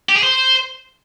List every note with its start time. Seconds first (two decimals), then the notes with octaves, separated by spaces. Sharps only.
0.09 G4
0.16 G#4
0.23 C5